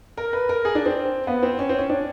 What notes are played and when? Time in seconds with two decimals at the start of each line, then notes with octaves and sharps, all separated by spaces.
0.17 A#4
0.33 B4
0.49 A#4
0.65 G#4
0.75 D4
0.85 C4
1.27 B3
1.43 C4
1.59 C#4
1.69 C4
1.78 C#4
1.89 D4